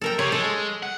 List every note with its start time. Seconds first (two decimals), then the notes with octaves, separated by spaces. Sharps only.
0.01 A4 A#4 G5
0.19 C3 C#5
0.32 G#3 A4
0.83 F#5